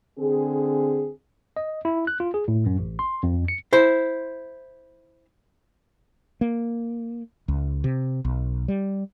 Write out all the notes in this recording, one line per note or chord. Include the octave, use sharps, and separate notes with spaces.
D3 C4 G#4
D#5
E4
F#6
F4
G#4
A2
F#2
A1
C6
F2
C#7
E4 C5
A#3
C#2
C3
B1
G3